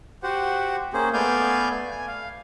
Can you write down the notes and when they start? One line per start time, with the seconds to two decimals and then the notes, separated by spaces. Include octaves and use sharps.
0.23 F#4 G4 C5 F#5
0.93 A#3 C#4 G#4 C5
1.13 A3 B3 D5 F5 G#5 G6
1.91 G#5
2.08 F5